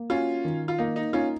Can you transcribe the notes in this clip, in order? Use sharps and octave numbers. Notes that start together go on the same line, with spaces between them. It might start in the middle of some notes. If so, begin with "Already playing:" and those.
Already playing: A#3
C#4 F4 F#4
D#3
F4
A#3 D#4
D#4
C#4 D#4 F4